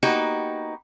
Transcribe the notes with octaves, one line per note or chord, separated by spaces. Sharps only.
A#3 B3 D#4 F#4 G4